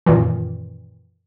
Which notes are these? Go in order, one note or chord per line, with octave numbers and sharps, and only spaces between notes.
F#2 A#2 D#3 E3